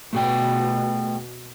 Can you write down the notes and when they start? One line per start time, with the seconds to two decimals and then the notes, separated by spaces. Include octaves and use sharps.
0.13 B2 A3 G#4 G5